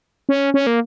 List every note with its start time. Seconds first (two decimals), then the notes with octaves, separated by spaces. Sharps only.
0.29 C#4
0.54 C#4
0.67 A#3